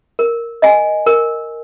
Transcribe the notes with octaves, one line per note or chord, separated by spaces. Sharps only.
A#4
D#5 G#5
A#4